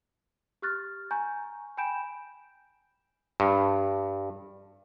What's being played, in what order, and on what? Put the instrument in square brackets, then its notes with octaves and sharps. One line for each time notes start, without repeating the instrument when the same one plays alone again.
[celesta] G4 C#6 F6 F#6 A6
G#5 A#5 C#6 G6
G5 G#5 B5 G6 D7 E7
[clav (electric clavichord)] G2